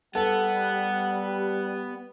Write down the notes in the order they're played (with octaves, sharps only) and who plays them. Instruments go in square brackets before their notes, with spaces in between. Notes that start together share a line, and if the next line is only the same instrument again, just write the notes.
[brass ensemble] G3 [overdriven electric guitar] B3 [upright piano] A4 [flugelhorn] F#5